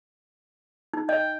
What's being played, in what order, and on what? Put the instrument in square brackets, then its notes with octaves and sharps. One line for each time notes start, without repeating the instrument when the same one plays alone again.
[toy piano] D#4
[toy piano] D#5 [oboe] G5